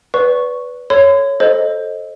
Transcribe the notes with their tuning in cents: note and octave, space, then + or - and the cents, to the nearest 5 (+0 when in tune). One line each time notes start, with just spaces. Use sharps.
B4 +0 D5 -25 C#6 +0
A4 +25 C#5 +0 C6 -45
A4 +0 C5 +20 D#5 +0